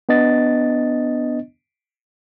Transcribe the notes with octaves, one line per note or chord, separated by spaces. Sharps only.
B3 D4 D#5 A6